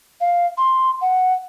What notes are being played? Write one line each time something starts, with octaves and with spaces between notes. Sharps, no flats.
F5
C6
F#5